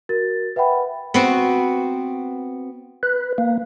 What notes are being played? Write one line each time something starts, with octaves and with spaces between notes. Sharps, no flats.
F#4 A#4 A6
B4 E5 F#5 G5 B5
B3 C4 F#4
B4
A#3